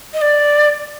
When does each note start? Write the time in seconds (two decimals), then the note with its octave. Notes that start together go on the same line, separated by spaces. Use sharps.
0.14 D#5
0.22 D5